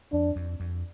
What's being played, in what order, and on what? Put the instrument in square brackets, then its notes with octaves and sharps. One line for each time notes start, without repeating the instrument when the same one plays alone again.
[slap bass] F2 [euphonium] D4
[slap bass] F2
F2